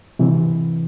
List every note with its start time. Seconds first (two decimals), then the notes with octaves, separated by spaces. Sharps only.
0.19 C3 E3 C4